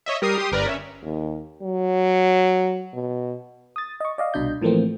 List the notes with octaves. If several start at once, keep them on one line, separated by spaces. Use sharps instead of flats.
C#5 D#5 E5
G3 A#4 D#6 C7
G4 C6 D#6
G1 A#4 B4 D5
C#4 E5
D#2
F#3
B2
D#6 A6
D#5 C#6
D5 D#5 F5
C2 B2 D4 D#5 G6
A2 E3 F3 A3 A#3 C4